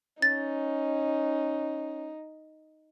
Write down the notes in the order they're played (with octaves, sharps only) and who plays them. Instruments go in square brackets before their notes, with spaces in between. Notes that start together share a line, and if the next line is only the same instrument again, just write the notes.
[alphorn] C#4 [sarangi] D#4 [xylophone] A6